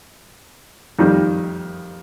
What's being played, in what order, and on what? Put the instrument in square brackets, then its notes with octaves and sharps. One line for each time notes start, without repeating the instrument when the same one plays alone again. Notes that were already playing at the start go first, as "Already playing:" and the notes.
[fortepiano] F2 D#3 G3